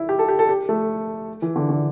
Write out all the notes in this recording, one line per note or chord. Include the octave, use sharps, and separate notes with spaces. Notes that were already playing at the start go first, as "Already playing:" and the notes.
Already playing: E4
G4
A4
G4
A4
G4
A3
E3
D3
D3